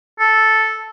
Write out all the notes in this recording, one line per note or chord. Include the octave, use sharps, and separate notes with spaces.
A4